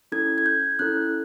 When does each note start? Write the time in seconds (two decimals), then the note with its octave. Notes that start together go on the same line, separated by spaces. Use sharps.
0.12 C#4 E4 A4 G#6
0.38 G#6
0.46 G6
0.79 C#4 E4 A4 F#6